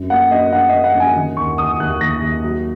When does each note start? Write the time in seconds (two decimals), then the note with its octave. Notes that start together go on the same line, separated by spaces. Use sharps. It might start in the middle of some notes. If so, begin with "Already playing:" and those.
Already playing: F#2
0.10 A#3 F#5
0.31 F#2 D#5
0.52 F#2 F#5
0.69 D#5
0.74 A#3
0.84 F#5
0.95 F#2
1.00 G#5
1.16 D#3
1.37 D#2 C#6
1.58 D#2 D#6
1.80 D#2 F#6
2.01 D#2 A#6
2.22 D#2
2.43 F#3